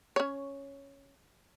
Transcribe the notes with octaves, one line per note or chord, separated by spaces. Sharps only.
C#4 C#5